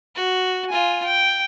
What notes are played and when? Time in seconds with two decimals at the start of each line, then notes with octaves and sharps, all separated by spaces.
0.15 F#4
0.69 F4 G#5
1.05 G5